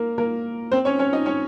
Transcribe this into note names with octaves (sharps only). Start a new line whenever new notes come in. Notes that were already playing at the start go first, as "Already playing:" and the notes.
Already playing: A#3 A#4
A#3 A#4
C4 C5
C#4 C#5
C#4 C#5
D#4 D#5
C#4 C#5